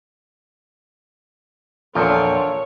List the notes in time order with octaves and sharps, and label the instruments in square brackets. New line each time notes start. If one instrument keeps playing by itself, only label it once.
[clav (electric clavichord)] E2 A#2 F3 [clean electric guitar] D4 F4 [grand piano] A4 A#4 [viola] C#5